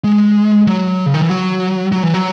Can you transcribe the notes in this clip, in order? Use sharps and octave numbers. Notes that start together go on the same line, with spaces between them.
G#3
F#3
C#3
D#3
E3
F#3
F#3
E3
F#3